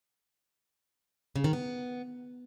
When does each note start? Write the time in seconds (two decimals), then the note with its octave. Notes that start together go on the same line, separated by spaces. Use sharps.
1.36 C#3
1.44 D#3
1.53 B3